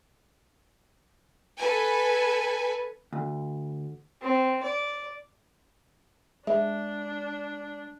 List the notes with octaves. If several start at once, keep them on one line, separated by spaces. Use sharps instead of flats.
A4 B4 G#5
D2
C4
D5
G#3 D4 E5